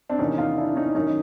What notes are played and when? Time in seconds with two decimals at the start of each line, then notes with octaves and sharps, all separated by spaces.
0.10 C4 D4
0.19 E2 C3 D#3 C#4 D#4
0.38 D#4 F4
0.58 D4 E4
0.76 C#4 D#4
0.95 F#2 D#3 C#4 D#4